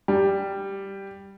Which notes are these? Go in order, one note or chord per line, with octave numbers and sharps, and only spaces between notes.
G3